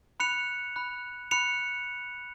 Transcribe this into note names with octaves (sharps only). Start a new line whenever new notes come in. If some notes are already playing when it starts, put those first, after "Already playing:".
B5 F#6 C#7 F7
B5 F#6
B5 F#6 C#7 F7